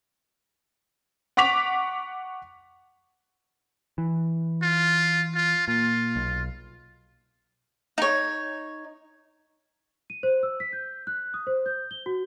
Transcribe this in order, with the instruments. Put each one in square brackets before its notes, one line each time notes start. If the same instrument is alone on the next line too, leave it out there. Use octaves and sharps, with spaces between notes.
[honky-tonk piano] F#5 C#6 D6 B6 F7
[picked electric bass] E3
[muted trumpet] F4
F4
[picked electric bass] A#2 [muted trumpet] F4
[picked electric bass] B1
[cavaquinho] D#4 C#5
[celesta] D#7
C5
E6
B6
G6
F#6
D#6
C5
G6
G7
F#4